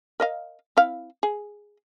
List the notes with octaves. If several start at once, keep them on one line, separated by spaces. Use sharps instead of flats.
A#4 D#5 F5
C4 E4 F5
G#4